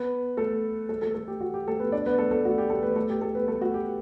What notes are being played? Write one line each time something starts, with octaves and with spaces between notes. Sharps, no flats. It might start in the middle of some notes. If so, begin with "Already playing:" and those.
Already playing: B3 B4
A3 A4
A3 A4
A3 A4
A3 A4
G4
F#4
G4
A3 A4
B3 B4
D4 D5
B3 B4
A3 A4
A3 A4
F#4
G4
A3 A4
B3 B4
A3 A4
G4
A3 A4
B3 B4
A3 A4
F#4
G4